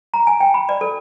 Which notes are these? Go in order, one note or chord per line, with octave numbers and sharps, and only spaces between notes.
A#5
G#5
G5
B5
D5
A4